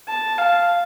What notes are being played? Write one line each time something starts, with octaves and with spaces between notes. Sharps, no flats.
A5
F5